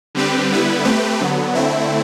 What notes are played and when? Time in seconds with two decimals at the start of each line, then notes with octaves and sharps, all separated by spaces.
0.15 D3 G3 C4 G4 B4
0.50 D3 G3 B3 E4 B4
0.85 A3 C4 G4 B4
1.20 D3 F#3 B3
1.55 D3 A3 C4 E4